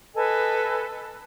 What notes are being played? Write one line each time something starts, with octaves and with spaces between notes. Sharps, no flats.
A4 B4 D#5 G#5